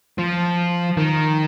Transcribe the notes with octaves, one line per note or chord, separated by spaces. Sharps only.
F3
D#3